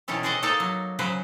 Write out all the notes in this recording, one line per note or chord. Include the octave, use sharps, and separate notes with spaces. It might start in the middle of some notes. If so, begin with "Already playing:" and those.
B2 D#3 E3 C#4 A4
F#4 G#4 C5 D5 D#5 F#5
A#3 D#4 A4 D5 D#5 A5
F#3
C#3 F#3 B4 C5